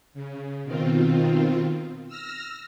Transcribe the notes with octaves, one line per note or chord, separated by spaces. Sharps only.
C#3
B2 D#3 C4 F4
E6 F6 A#6